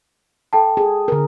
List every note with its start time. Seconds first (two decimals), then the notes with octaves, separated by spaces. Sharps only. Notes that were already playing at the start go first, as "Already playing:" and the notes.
0.53 A4 G5 A5
0.77 G#4
1.08 D3 A#4